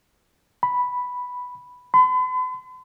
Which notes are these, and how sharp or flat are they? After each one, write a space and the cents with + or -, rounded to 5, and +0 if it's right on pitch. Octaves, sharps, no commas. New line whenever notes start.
B5 +0
B5 +45